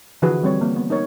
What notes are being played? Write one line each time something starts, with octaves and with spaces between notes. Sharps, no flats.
D3 E3 F3 F#4 G#4 B4
G3 C4 C#5
A#3 C4
B3
D#4 A#4 C#5